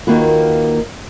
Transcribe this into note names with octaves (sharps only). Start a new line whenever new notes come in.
D#2 D#3 A#3 F4 F#4 B4